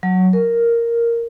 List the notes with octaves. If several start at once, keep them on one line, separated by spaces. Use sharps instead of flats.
F#3
A#4